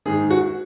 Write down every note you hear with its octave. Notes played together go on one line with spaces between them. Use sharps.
G#2 D#3 G#4
F#4